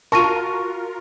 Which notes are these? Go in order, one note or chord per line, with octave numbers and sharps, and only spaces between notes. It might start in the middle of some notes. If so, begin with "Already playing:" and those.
F4 F#4 A#4 A5 C#6 A#6 D#7